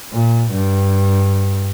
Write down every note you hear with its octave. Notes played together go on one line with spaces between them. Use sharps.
A#2
G2